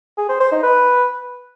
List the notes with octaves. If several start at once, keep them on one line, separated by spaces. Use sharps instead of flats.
G#4
C5
C5
D#4
B4